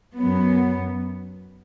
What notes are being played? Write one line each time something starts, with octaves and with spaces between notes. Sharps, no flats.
F#2 F#3 B3